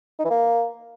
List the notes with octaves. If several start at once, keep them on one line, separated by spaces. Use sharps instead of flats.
D#4
E3
A#3